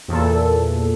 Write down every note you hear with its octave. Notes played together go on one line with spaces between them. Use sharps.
E2 A#2 A4